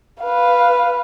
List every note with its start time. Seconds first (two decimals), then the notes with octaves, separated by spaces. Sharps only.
0.22 B4 F5